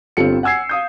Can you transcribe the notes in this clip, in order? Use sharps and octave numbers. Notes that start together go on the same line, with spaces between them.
G1 C4 F4 G4 A4 C#7
F#5 G#5 E6 G#6 C7
F5 D#6 G6